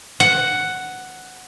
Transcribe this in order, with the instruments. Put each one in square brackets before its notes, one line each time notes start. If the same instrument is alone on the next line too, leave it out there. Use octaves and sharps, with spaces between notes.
[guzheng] F#5